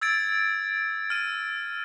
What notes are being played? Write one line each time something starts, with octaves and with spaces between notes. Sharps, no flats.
E6 G#6 A6 D7
F6 D#7